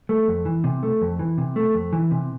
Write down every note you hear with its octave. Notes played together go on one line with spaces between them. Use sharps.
A3
F2
E3
C3
A3
F2
E3
C3
A3
F2
E3
C3